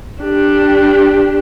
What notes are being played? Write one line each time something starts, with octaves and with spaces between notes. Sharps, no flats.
D4 G4